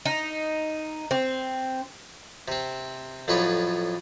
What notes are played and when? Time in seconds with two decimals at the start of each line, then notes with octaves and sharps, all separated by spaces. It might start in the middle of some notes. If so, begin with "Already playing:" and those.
0.05 D#4
1.11 C4
2.48 C3 C4
3.28 F2 A2 F#3 B4 C#5